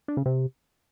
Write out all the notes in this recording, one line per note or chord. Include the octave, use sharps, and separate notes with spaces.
D4
C#3
C3